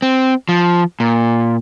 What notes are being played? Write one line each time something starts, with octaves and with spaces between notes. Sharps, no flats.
C4
F3
A#2